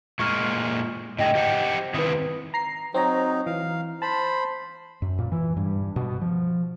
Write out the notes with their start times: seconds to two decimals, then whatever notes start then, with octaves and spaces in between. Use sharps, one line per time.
0.19 A#2 G#3 C#6 F6
1.19 A2 D3 G#4 D#5 G5 A#6
1.35 G4 C5 F#5
1.94 D#3 C4 E4 B4 D#6
2.54 A#5 C7
2.94 F#3 C4 D#4 C#5 A#5
3.46 E3 F5
4.02 C5 A5 B5
5.02 F#2
5.18 A#2
5.32 E3
5.57 G2
5.96 B2
6.21 F3